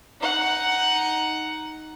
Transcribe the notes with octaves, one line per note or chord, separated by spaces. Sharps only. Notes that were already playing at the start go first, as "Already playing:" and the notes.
D#4 F#5